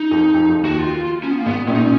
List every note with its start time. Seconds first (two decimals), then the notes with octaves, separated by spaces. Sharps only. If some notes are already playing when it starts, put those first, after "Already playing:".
Already playing: D#4
0.11 F2 F3
0.34 F2 F3
0.49 F2 F3
0.63 D#2 D#3 F#4
0.79 F4
1.23 C#4
1.31 B3
1.38 A#3
1.46 G#1 G#2 B3
1.68 A#1 A#2 C#4
1.75 D#4
1.82 C#4